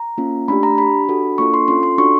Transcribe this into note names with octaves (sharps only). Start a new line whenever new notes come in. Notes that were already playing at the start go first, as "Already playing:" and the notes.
Already playing: A#5
A#3 C#4 F4
A3 D4 G4 B5
A#5
D4 G4 B5
D4 F#4 A4
A#3 D4 F4 A4 C#6
C6
C#4 F4 A4 C6
C6
D4 F#4 A4 C#6